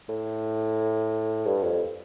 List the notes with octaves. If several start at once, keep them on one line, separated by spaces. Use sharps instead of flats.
A2
G2
F2